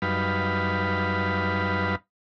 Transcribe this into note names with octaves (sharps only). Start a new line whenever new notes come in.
F#2 G3 D#4 B4 F5 B5